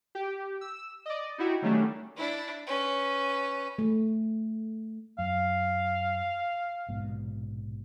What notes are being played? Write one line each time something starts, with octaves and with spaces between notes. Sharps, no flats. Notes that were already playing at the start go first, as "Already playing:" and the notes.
G4
E6
D5 D#5
D#4 E4 F#4 G4
D#3 F#3 G3 A3 C#4 D4
D4 E4
C#4 B4
A3
F#2 F5
A#1 G#2 B2